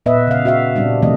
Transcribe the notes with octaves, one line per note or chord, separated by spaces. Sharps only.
A#2 B3 B4 D#5 E5
C#3 F5
F#4 E5 F5
A#2 G3 C4 D4
C3 D#3 F3 A3 C4 D#5